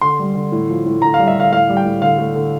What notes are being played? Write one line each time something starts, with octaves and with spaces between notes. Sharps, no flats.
D3 C6
G3
D3
A2
F3
A2
D3 A#5
F5
G3
E5
D3 F5
A2 F5
G3
G5
A2
D3 F5
A3
D3